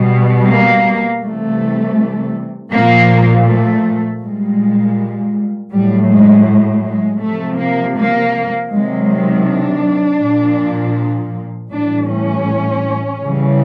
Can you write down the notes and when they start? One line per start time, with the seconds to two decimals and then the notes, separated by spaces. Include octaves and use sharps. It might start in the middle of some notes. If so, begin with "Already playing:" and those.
Already playing: B2 G3
0.47 A#3
1.22 C3 E3 G3 A3
2.71 A#2 F3 A#3
3.47 A3
4.21 A#2 G3 G#3
5.72 A2 F#3 G3
6.10 G#3
6.46 G#3
6.84 G#3
7.22 C3 F3 A3
7.59 A#3
7.97 A#3
8.71 C3 D#3 F#3 G#3
9.10 G#3
9.47 D4
10.22 A#2 F3
11.72 A2 E3 G3 D4
12.10 C#4
13.22 C#3 E3 G3